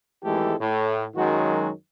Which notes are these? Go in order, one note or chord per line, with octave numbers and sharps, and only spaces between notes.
G#1 E3 G#3 A3 G4 A4
A2
F#2 D#3 F#3 G#3 F#4